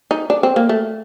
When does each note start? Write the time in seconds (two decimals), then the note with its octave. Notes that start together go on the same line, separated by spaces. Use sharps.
0.11 D#4
0.30 D4
0.43 C4
0.56 A#3
0.69 A3